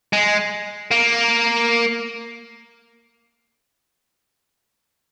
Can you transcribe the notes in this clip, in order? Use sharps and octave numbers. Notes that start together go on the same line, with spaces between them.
G#3
A#3